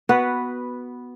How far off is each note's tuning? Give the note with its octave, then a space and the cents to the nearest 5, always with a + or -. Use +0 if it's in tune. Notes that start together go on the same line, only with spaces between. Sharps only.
B3 +0 F#4 +0 B4 -5